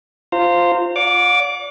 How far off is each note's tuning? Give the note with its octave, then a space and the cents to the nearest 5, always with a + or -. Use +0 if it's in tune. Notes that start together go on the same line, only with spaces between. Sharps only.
F4 +0 C5 -5 A#5 -30
D5 -40 F#5 -45 D6 +0